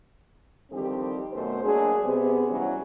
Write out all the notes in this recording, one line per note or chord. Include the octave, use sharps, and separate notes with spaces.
D3 D#3 F3 G3 C4 G4
F#2 B2 A3 C5
F#3 G#3 A#3 D4 G#4
C3 B3 G#4
C#3 E3 F#3 G3 C#4